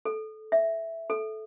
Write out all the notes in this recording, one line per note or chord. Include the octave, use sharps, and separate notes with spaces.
A4
E5
A4